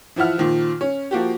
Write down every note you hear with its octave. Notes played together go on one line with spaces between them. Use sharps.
E3 F3 E4 F#5 F6
A#2 D#3 F3
C#4
F3 A#3 F#4 G4